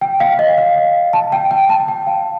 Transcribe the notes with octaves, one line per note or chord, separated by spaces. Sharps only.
G5
F5
D#5
F5
A5
G5
G5
A5
G5
F5